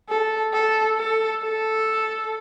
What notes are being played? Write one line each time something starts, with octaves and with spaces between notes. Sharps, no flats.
A4
A4
A4
A4